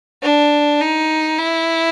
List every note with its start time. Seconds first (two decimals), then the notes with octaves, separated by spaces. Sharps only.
0.22 D4
0.81 D#4
1.38 E4